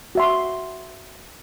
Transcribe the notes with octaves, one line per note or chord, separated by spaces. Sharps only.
F#4 E5 C6